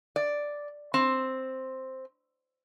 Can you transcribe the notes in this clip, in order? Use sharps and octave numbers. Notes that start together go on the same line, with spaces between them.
D5
C4